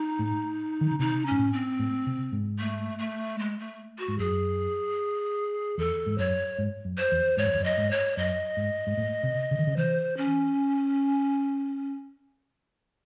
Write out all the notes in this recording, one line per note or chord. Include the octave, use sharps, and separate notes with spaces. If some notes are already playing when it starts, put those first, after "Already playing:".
Already playing: D#4
A2
D#3
C#3
C3 D#4
G#2 C#4
A2
C4
A2
C3
G#2
A3
A3
G#3
A3
F#4
G#2
F#2 G#4
E2 A4
G#2
F#2 C#5
G#2
F#2
C5
E2
G#2 C#5
F#2
E2
F#2
D#5
G#2
C#5
F#2 D#5
G#2
G#2
A2
C3
C#3
D#3
C#3
E3 C5
C#4